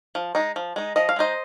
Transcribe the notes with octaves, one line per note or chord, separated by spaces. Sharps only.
F3
G#3 D#4
F3
G#3 D#4
F3 D#5
F5
G#3 D#4 C5 D#5